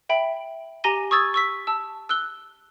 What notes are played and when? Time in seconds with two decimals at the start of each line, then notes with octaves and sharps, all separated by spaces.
0.09 E5 G5 B5
0.84 G4 G#5 A#5 A#6 D#7 G7
1.11 C#6 D#6 E6 G#6 A6
1.34 C#6 E6 B6
1.67 A5 E6
2.09 E6 F#6 G7